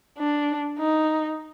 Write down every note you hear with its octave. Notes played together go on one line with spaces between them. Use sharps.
D4
D#4